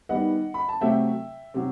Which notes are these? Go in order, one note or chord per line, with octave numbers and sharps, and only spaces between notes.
D#3 G3 B3 D#5 F#5
B5
A5
C3 F#3 A3 C4 E5 G5
C3 F#3